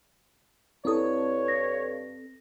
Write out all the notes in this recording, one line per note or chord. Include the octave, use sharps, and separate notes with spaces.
G2 C4 E4 A4 C#5 D#6
A#6